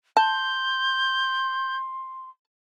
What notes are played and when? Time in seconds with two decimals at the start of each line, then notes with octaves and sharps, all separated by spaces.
0.17 A5 C6 G6